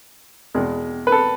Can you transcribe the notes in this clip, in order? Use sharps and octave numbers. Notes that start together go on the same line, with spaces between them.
E2 B2 G#3
B4
A4